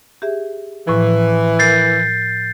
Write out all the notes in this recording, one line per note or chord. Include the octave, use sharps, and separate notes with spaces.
G4 G#4 E5
A2 E3 F3
A#4 G6 A6 C7